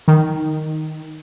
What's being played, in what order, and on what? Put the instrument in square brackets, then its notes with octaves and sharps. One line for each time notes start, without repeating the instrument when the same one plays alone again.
[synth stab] D#3